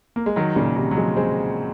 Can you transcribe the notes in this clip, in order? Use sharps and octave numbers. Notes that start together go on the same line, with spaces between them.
A#3
G#3
D#3 F#3
A#2 C#3
C3 D#3
F#3
F3 G#3
G#3 C4